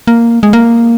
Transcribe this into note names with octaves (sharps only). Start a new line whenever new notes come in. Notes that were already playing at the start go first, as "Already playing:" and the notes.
A#3
G#3
A#3